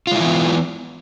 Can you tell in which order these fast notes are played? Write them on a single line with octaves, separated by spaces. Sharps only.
F4 G#3 E4 E3 B3